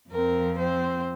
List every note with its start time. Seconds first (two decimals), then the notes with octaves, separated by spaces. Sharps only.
0.10 F2 F3 C4 A#4
0.58 C4 C5